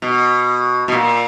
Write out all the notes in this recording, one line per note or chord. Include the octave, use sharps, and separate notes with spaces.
B2
B2
A#2